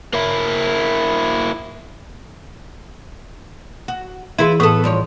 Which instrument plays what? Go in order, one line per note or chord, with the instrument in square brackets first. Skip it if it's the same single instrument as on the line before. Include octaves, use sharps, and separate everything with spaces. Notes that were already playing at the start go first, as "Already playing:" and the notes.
[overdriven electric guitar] A#3 E4
[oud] F#4
[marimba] E3 G#4 [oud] E4 F4 B4
[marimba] A2 [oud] B3 A4
[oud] G2 F3 C#5